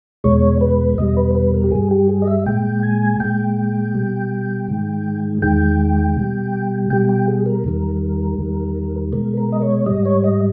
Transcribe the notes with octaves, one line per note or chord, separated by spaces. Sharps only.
E2 B2 G#3 C#5
B4
E2 B2 G3 D#5
B4
B4
A#4
G4
G2 G3 G#4
G4
G#4
D#5
E5
A#2 G#3 G5
G#5
A#2 G#3 G5
B2 G3
G#2 D#3 G#3
E2 D#3 G#3 G5
B2 G3
B2 G3 G5
G5
G#4
A#4
E2 D#3 G3
E2 D#3 G3
B2 G#3 A#4
A#4
D#5
C#5
G#2 G3 D#5
C#5
D#5